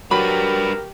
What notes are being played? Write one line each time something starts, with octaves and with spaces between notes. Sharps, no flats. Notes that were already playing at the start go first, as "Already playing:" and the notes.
F#3 D4 G4 A#4 B4 B5